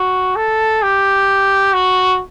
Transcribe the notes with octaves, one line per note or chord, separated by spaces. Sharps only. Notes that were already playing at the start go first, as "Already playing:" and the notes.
Already playing: F#4
A4
G4
F#4